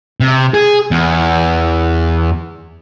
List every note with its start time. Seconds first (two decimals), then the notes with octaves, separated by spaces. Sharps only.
0.20 C3
0.54 G#4
0.91 E2